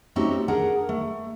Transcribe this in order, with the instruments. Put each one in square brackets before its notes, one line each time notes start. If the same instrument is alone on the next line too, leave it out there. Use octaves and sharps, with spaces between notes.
[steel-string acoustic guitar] A3 C4 C#4 D#4 F#4 G4
D4 G#4 A#4 F#5 A#5
A3